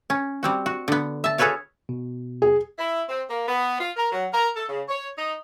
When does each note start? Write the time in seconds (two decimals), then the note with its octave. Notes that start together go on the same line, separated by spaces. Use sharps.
0.10 C#4
0.43 G3 C4 F#4
0.66 F#4
0.88 D3 B3
1.24 E5 A5
1.38 F#4 G#4 A4 B4 C#5 F5
1.89 B2
2.42 G#4
2.79 E4
3.09 C4
3.29 A#3
3.48 B3
3.80 F4
3.97 A#4
4.12 F#3
4.33 A#4
4.56 A4
4.69 C#3
4.89 C#5
5.17 D#4